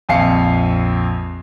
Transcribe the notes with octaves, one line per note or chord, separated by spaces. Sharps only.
A#1 F2 F5 C7 C#7